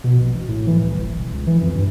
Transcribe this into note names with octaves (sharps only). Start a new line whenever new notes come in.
B2
A#1
A1
A2
E3
C2
F#1
E1
C#2
E3
F2
G2